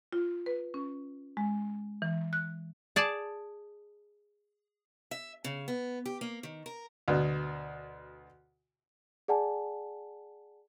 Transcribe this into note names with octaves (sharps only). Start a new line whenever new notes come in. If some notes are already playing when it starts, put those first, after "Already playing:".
F4
B4
C#4
G#3
E3
F#6
G#4 D5 A5
E5
C#3
B3
G4
A#3
D#3
A#4
D2 B2
G#4 D5 F#5 G#5 A5